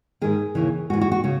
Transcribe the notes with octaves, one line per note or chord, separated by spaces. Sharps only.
G#2 D#3 G#4
D#2 C#3 E3
G#2 E3 F#4
F#4
F#4
C#3 F#4